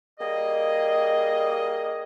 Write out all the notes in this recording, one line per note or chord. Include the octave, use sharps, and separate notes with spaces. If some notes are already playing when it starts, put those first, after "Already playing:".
G3 A#3 G#4 D#5